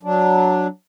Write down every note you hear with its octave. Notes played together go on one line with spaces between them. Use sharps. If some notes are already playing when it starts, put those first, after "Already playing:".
F#3 D4